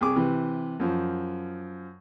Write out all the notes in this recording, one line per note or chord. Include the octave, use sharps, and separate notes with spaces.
C2 G#4 D6
C3 E3
F#2 F3